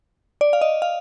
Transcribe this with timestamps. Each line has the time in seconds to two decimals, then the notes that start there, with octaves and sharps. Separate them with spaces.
0.41 D5
0.53 F5
0.61 D#5
0.82 F5